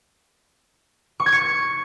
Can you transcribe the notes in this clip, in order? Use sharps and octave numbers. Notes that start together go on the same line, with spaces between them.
C#6
G#6
C#7